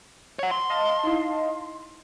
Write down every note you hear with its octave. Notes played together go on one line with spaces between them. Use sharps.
C#5 F#5
C6
D#5 F5 A5
D#4 E4